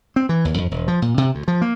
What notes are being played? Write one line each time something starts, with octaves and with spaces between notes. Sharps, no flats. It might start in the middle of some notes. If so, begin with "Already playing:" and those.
C4
E3
D#2
F2
E1
F3
A#2
C3
D2
F3
A#3